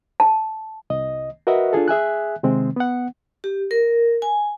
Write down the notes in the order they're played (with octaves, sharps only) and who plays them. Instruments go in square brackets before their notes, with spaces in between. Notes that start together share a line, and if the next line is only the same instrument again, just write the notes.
[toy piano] A5
[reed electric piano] C2 D#5
F#4 A#4 B4 D#5 E5 F#5
D4 F4 G#4 A4
G#4 E5 G#5 F#6
C3 D#3 G#3 C4
B3 F#5
[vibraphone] G4
A#4
G#5